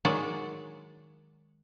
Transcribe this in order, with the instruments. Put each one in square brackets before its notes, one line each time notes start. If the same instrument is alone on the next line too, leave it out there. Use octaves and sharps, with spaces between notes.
[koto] D#3 F#3 G#3 F#4 D5